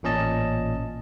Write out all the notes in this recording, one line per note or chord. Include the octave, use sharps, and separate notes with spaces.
A1 A#2 C#4 D#5 A5